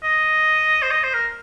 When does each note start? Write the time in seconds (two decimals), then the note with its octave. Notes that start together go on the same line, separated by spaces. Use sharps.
0.03 D#5
0.82 C5
0.91 D#5
1.04 C5
1.14 A#4